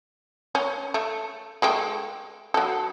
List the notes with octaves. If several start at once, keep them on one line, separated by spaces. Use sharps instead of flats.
C#4
A3
G#3 A3 G4
F#3 A4